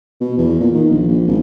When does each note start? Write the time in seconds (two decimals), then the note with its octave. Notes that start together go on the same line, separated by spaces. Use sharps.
0.20 B2
0.38 E2
0.60 A#2
0.74 D#3
0.90 A#1
1.08 A#1
1.27 G#1